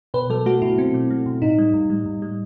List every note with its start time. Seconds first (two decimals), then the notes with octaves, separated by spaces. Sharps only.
0.14 B2 B4
0.30 F#3 A4
0.46 A3 F#4
0.62 B2 E4
0.78 B2 C4
0.94 F#3
1.10 A3
1.26 B2
1.42 A2 D#4
1.58 G3
1.74 A2
1.90 G3
2.06 A2
2.22 G3